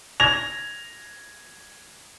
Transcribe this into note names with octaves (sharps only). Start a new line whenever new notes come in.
G#6 A#6 F7